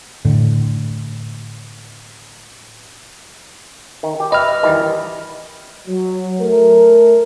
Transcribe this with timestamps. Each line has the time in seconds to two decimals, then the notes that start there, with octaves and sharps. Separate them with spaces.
0.25 A2 D3
4.03 D#3
4.20 G4
4.32 B4 D#5 E5 F6
4.63 D#3 E3 G3
5.87 F#3
6.40 A3 A#4